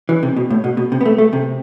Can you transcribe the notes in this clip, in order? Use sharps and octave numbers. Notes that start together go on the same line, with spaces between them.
E3
C3
B2
A2
B2
B2
C3
B3
A3
A3
C3